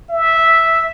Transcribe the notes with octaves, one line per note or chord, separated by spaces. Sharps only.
E5